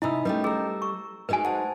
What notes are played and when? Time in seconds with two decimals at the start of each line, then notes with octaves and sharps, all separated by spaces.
0.02 C3 D#4 E4 D#5 G#5 B5 D#6 E6
0.25 G3 A3 C#4 B4 D#5 G5
0.44 G#4 A#5 E6
0.82 C#6
1.29 G#3 D#4 F#4 B4 G#5
1.45 C5 F#5 G#5 A5